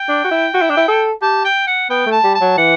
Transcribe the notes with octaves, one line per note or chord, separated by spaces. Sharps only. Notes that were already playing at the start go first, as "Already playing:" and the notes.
Already playing: G5
D4
F#4
E4
F#4
E4
D4
E4
A4
G4 A5
G5
F#5
B3 G5
A3
A5
G3
A5
F#3
E3 F#5